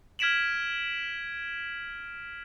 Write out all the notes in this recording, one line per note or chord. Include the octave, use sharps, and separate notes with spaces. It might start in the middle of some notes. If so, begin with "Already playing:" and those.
F6 G#6 B6 D7 E7 F#7